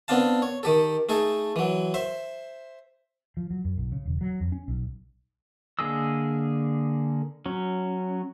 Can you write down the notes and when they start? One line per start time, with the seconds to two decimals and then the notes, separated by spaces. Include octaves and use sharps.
0.08 B3 C4 D4 F5 A5
0.42 C#5
0.63 D#3 G4 A4
1.09 A3 D#4 G#4 A4
1.56 E3 F#3
1.94 C5 E5
3.37 F3
3.50 F#3
3.65 F#2
3.78 B1
3.92 C#3
4.05 E1
4.21 F#3
4.40 F2
4.52 C#4
4.68 B1
5.79 D3 A#3 G#4 D#5 E6
7.46 F#3 C#4